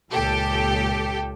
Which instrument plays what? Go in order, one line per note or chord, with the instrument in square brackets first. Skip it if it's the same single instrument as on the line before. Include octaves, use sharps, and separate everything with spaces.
[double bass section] C#2 A#2 [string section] G4 A4